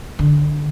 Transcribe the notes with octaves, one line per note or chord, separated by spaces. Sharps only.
D3